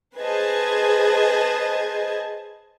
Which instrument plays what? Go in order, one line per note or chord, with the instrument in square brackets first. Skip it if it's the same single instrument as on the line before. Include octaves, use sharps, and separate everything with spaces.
[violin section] G#4 B4 C5 D#5 A5 G#6